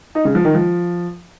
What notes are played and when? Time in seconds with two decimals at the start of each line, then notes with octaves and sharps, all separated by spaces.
0.15 D#4
0.25 C#3
0.35 F3
0.45 D#3
0.55 F3